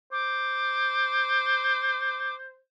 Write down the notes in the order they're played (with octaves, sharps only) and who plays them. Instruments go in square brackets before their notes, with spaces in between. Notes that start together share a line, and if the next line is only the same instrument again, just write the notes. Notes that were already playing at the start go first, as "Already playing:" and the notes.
[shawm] C5 [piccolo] D6